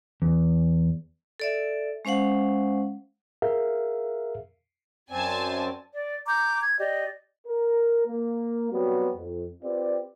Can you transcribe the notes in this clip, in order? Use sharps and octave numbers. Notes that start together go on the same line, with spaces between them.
E2
A4 D5 E5
G#3 C#4 C5 F5 F#5
G#4 A#4 E5 F5
F#2 C4 D5 G#5 A5
D5
A#5 D6 G6
G#6
G4 D5 D#5
A#4
A#3
F#3 G3 B3 C4 F#4
F2
C4 F4 G4 B4 D5